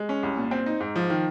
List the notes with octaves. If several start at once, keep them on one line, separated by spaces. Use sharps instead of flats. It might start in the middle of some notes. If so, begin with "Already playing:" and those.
Already playing: G#3
C#4
C2
A#2
C4
D#4
G#2
F3
D#3